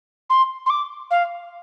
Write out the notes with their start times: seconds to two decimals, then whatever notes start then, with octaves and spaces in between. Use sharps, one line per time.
0.30 C6
0.66 C6
0.70 D6
1.11 F5